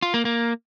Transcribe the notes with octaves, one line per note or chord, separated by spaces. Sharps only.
F4
A#3
A#3